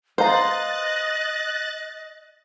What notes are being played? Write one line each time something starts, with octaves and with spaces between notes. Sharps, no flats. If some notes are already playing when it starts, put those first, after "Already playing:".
B4 C5 D#5 F5 A#5 F#6 A6